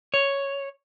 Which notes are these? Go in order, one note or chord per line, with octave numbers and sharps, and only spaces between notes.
C#5